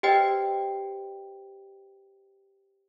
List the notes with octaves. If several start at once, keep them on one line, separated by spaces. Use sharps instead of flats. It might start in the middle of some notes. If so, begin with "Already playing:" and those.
G4 B4 C5 D#5 G5